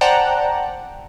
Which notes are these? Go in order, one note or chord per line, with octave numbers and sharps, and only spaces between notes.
C5 D5 F#5 G5 A5 A#5